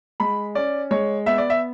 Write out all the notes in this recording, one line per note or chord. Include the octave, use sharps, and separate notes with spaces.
G#3 B5
C#4 D5
G#3 C#5
B3 E5
D5
E5